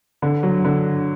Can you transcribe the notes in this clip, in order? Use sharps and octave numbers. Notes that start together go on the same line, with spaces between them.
D3
F#3
D3